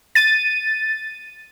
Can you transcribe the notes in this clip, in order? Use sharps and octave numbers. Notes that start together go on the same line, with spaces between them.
A6 D#7